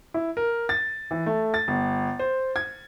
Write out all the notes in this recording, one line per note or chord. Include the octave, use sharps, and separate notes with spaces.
E4
A#4
A6
E3
A3
A6
G1
C5
G#6